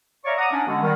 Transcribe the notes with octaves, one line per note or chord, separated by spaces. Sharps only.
C#5 D5 E5 F5 A#5 C#6
F#5 A#5 D6 D#6
C#4 D4
D3 G#3 B3 F#4
D#3 G3